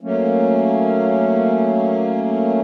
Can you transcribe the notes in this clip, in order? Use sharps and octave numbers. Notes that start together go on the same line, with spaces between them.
F#3 A3 A#3 C#4